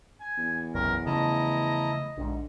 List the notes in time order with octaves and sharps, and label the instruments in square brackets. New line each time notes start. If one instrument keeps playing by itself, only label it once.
[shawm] G#5
[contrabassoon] E2
[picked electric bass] F1 B1 F#2 [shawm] A#4
[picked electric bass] C#3 F3 A3 [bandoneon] E4 A5 A#5 [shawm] D#5
[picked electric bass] A#1 G#2 [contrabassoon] D3